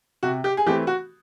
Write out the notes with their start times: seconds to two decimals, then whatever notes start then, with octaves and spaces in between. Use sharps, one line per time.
0.23 C3 F#4
0.44 G4
0.57 G#4
0.66 E3 A3 C4 G4
0.87 F#4